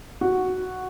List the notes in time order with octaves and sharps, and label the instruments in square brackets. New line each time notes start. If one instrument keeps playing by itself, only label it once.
[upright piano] F#4